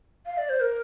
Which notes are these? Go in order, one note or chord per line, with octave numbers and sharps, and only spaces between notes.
F5
D5
C5
A#4